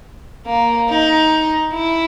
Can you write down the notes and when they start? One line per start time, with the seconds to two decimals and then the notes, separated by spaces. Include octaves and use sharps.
0.47 A#3
0.90 D#4
1.74 E4